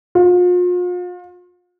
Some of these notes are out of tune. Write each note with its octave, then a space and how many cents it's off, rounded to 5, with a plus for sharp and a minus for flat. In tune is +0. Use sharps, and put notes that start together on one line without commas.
F4 +40